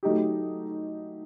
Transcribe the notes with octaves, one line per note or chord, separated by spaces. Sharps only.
F#3 A3 D#4 G4